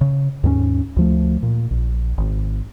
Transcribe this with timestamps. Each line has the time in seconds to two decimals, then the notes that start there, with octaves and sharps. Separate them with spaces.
0.01 C#3
0.44 D#2 G#2 G3 C#4
0.96 D2 F3 A3
1.43 A#2
1.71 A#1
2.18 G#1